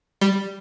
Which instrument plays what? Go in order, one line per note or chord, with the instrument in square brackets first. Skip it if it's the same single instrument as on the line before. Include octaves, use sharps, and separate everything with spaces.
[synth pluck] G3